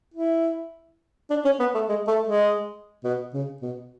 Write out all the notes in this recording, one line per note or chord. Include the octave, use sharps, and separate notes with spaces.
E4
D4
C#4
B3
A3
G#3
A3
G#3
B2
C#3
B2